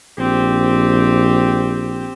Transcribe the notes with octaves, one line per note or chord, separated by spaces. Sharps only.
A#1 C4 G4